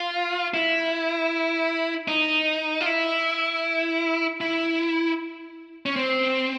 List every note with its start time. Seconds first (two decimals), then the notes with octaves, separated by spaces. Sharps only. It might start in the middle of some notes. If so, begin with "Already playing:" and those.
Already playing: F4
0.54 E4
2.08 D#4
2.81 F4
2.86 E4
4.41 E4
5.86 C#4
5.96 C4